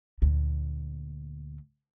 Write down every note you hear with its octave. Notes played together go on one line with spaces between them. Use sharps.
D2 A#2